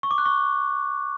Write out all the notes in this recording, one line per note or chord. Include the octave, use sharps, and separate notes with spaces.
C#6
D6
F#6
C#6